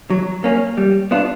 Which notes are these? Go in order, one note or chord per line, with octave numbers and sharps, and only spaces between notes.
F#3
A#3 C#4
G3
B3 D4 F4